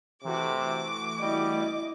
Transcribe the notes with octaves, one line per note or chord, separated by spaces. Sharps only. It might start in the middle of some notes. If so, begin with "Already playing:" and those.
C3 E3 A3 F#4 D6
G3 E4 D#5